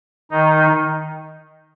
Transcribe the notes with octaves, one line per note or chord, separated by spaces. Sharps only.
D#3 D#4